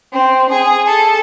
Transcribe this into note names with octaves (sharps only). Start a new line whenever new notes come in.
C4
G#4
A4